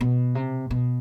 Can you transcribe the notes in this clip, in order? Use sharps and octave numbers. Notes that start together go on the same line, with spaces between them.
B2
C3
B2